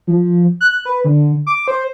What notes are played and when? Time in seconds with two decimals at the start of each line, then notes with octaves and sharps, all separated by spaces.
0.07 F3
0.61 F#6
0.85 B4
1.04 D3
1.47 D6
1.68 C5